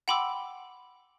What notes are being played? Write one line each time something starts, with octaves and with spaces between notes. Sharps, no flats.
F#5 G5 B5 C6 D6 E6